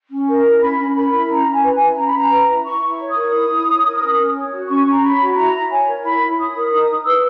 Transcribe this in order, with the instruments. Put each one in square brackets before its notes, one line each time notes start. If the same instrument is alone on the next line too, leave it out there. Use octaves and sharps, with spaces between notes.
[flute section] C#4
A#4
E4
C#4 B5
C#4
A#4 B5
E4
C#4 A#5
C#4
G#5
B4
G#5
E4
C#4 A#5
B5
C#4 A#5
B4
E4
E4 C#6
E4
C#5
D#6
A#4
E4
E4
C#5
A#4
C#4
C#4
C#5
F#4
C#4 C#6
C#4
A#5
C#5 B5
F#4
E4 A#5
E4
C#5 G#5
A#4
E4 B5
E4
C#5 D#6
A#4
D#4 D#6
D#4
B4 E6